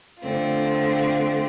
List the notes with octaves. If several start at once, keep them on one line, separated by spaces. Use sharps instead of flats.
D3 A3 C4 F4